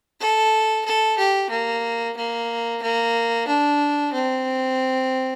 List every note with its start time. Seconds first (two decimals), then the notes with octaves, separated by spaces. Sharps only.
0.20 A4
0.85 A4
1.18 G4
1.50 A#3
2.16 A#3
2.82 A#3
3.48 D4
4.13 C4